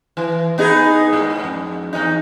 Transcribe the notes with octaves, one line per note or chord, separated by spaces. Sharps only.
E3
B3 D#4 G#4
G#2
F2
E2 D#4